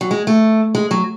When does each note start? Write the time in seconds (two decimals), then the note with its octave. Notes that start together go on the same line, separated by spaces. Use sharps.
0.01 F#3
0.11 G#3
0.27 A3
0.75 G#3
0.91 F#3